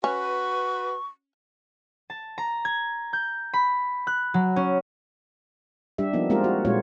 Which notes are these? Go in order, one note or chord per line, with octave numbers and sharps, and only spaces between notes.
C#4 F#4 B4 C#6
A5
A#5
G#6
G6
B5
F#6
F#3
C#4
G3 D4 G4 E5
F3 A#3 B3 D#4
G#3 A#3 C4 F4 G4 A#4
F#4
A#2 G3 G#3 C4 F4 C#5